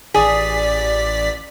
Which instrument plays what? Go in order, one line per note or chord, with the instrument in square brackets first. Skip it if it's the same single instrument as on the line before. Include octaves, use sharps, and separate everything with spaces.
[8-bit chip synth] A1 D5 B6 [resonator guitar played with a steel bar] G#4